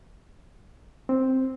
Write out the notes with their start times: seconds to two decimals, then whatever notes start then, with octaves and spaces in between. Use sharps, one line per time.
1.09 C4